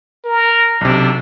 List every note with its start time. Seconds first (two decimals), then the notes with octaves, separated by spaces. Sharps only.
0.25 A#4
0.81 B1 C3 D4